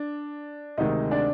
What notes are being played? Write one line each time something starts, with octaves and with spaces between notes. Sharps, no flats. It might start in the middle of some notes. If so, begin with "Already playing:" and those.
Already playing: D4
D2 C3 D#3 G#3 D#4 D#5
D4 D5